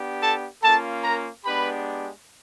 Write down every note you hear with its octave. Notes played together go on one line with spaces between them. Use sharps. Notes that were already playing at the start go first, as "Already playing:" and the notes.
Already playing: B3 D4 G4
A4 A5
A#3 C#4 F4 A4 A5
A#4 A#5
G#3 B3 D4 G4 B4 B5